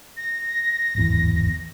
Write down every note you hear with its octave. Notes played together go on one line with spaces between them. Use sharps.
A#6
D1 G#1 E2